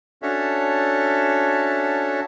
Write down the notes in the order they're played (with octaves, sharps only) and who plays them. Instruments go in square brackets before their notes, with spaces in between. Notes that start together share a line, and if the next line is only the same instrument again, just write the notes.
[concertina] C#4 D4 F#4 A4 C#5 E5